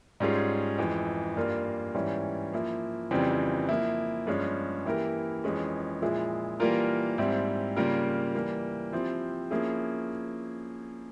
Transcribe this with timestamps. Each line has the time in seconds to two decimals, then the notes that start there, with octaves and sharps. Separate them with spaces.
0.20 G#2 G3 C#4 F4 G#4
0.78 F2 E3 G#3
1.36 G2 G3 A#3 F4 A#4
1.94 G#2 E3 G3 C#4 E4
2.52 F3 A#3 E4
3.11 F2 C#3 E3 G3 C4
3.69 F3 A#3 E4
4.27 G2 F3 G#3 C#4
4.85 E3 A#3 E4 G4 A#4
5.44 F2 E3 G#3 C#4
6.02 A#2 F3 G#3 E4 G#4
6.60 E3 G3 A#3 F4 A#4
7.18 G#2 G3 C4 E4
7.76 C#3 G3 A#3 F4 A#4
8.35 E3 G3 A#3
8.93 F3 C4 E4 G4
9.51 F3 A#3 C#4 E4 G#4